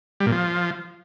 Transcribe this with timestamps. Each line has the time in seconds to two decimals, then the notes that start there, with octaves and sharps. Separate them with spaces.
0.20 G3
0.26 A#2
0.32 F3